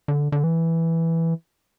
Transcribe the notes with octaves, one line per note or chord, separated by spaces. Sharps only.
D3
D3
E3